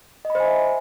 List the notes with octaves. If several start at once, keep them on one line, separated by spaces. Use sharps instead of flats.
D#5
B5
C5
G#5
E5